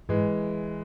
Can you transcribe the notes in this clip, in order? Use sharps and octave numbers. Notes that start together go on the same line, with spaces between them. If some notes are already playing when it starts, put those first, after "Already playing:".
G#2 E3 G#3